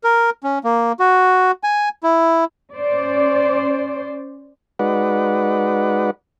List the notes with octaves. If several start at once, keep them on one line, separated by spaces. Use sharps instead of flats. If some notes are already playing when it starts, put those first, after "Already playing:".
A#4
C#4
A#3
F#4
G#5
E4
C#4 C5 D5
G#3 D#4 F#4 B4 D5 F#5